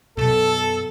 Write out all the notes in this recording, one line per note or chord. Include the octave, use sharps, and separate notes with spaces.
F#2 B2 A4